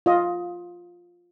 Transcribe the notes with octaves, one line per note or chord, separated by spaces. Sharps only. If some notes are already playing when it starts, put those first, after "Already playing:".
F4 D#5